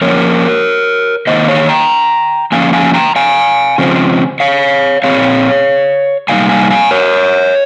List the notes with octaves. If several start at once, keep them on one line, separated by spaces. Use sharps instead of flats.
F3 A#3 C#4 A#4 C#5
D#3 A#3 D#4 C5 D#5
C#5 F5
G5 A#5
F3 A#3 C#4 F5 G#5
F5 G#5
G5 A#5
F5 G#5
C#3 F3 C4
C#5 F5
A#2 G#3 C4 C#5 F5
C3 G3 A#3 D#4 F5 G#5
F5 G#5
F5 G#5
A#4 C#5